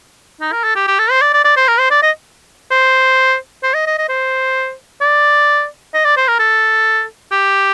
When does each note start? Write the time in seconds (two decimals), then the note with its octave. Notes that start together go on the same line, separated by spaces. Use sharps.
0.41 D#4
0.52 A#4
0.64 A4
0.75 G4
0.87 G4
0.99 A4
1.10 C5
1.21 D5
1.33 D5
1.44 D5
1.56 C5
1.68 A#4
1.79 C5
1.91 D5
2.03 D#5
2.71 C5
3.63 C5
3.74 D#5
3.87 D#5
3.98 D#5
4.09 C5
5.01 D5
5.94 D#5
6.05 D5
6.17 C5
6.28 A#4
6.39 A4
7.32 G4